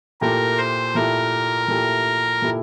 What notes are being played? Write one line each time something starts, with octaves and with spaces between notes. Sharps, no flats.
A#2 A3 E4 G4 A#4
C5
A#2 A3 E4 G4 A#4
A#2 A3 E4 G4
A#2 A3 E4 G4